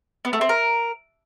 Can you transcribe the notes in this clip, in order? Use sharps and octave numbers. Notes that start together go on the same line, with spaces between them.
B3
A3
C4
A#4